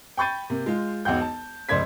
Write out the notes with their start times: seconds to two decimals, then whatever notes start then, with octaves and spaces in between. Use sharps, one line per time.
0.17 G5 B5 C#6 G6 A6 D#7
0.50 C3 A#3
0.66 G#3 F4
1.05 E1 B1 F#5 G5 G6
1.21 A5
1.69 F1 C#2 C5 D5 G#6 B6